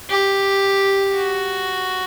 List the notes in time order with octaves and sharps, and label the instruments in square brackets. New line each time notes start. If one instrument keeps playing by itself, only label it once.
[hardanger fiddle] G4
F#4